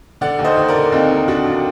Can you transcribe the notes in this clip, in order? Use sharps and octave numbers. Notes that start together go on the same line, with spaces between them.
D3 D5 F#5
D#2
C5 D#5
D#2
A#4 D5
D3
D#2 C4 D#4
D#2
D#2 D4 F#4
D#2